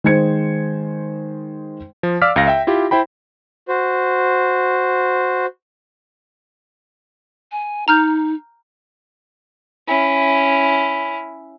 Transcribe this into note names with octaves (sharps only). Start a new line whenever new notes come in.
D#3 G#3 C5 G#6 C#7
F3
D5 F5 D6 E6 F6 B6
C#2 F5 A#6
E5 G5
E4 F4 G4
E4 C5 G5 B5
F#4 C5
G#5
D#4 A#5 F6 G6
C#4 E4